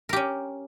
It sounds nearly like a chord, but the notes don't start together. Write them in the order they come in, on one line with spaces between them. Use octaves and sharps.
A#4 G4 C#4